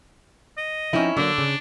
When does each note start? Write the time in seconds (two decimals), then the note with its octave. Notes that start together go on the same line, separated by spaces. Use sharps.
0.57 D#5
0.93 F3 C4 C#4 D#4 E4
1.17 D3 F#3 A#3 D4
1.38 C#3